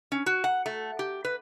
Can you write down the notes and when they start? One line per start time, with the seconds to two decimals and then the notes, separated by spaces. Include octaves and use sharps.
0.12 C#4
0.26 F#4
0.44 F#5
0.66 A3
0.99 G4
1.25 B4